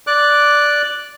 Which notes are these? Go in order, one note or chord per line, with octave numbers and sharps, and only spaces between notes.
D5 D6 F#6